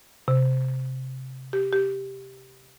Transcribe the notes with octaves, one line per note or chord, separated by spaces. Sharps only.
C3
G4
G4